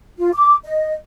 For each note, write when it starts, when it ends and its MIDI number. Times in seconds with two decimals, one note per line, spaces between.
0.18 0.30 65
0.34 0.55 86
0.65 0.94 75